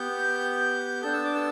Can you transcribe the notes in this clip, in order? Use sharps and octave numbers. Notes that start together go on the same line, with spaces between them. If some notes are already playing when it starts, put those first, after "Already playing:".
Already playing: B3 G4 G6
B3 D4 A4 G6
E6
D6
E6